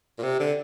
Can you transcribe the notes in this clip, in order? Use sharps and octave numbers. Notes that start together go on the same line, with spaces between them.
A#2
C3
D3